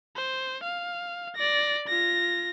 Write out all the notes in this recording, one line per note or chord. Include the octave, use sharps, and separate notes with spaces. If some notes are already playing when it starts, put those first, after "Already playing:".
C5
F5
D5 A#6
F4 A#6